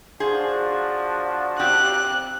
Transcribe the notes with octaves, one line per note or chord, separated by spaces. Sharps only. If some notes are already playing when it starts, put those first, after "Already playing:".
F3 D4 F#4 G#4 C5
C4 G4 F#6